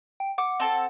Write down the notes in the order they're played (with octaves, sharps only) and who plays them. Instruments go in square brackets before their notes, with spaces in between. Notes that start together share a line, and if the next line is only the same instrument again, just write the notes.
[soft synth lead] G5
[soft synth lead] F#5 [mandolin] D6
[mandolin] C4 A4 A5